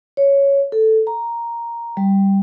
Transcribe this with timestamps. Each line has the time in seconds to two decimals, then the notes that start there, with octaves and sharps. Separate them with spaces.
0.17 C#5
0.72 A4
1.07 A#5
1.97 G3